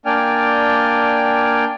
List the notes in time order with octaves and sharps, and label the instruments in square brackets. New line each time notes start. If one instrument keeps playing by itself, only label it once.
[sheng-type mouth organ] A#3 D4 D5 G5 G#5 F6